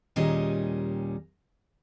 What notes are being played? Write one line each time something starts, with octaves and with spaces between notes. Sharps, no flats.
D#2 A#2 G3 C#4 G#4 D#5